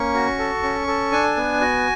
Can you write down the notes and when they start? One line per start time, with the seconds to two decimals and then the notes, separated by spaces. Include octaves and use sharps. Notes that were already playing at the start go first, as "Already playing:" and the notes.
Already playing: A#3 C#4 C#6
0.14 F#4
0.39 A4
0.63 C#4
0.87 A4
1.12 D4 G#5
1.37 B3
1.61 F#4